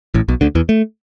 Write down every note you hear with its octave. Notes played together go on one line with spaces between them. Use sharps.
A1 A2
B1 B2
D2 D3
E2 E3
A3